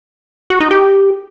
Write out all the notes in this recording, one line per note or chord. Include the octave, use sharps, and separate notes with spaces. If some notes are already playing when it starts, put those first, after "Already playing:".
F#4
D#4
G4